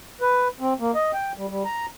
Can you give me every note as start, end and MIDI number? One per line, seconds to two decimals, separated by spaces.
0.21 0.48 71
0.60 0.74 60
0.80 0.91 58
0.95 1.11 75
1.14 1.32 79
1.37 1.47 55
1.49 1.63 55
1.65 1.86 82